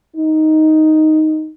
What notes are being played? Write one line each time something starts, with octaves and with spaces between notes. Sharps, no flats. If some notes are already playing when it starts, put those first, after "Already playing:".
D#4